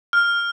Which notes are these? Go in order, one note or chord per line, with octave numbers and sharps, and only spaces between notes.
F6